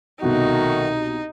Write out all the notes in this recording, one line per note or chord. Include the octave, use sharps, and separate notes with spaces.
C2 B2 D#3 A3 D#4 F#4